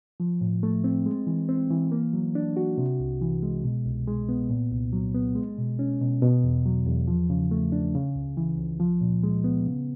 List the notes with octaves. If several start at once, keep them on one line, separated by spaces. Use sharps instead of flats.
F3
A2
A3
C4
G#3
E3
C4
E3
A#3
F#3
D4
F#4
C3
C2
E3
G#3
B2
C2
G#3
B3
A#2
C2
F#3
B3
G#3
B2
C#4
B2
B2
E2
F#3
E2
F3
C#3
A3
D4
C#3
C#2
E3
C#2
F3
A#2
G#3
B3
C#3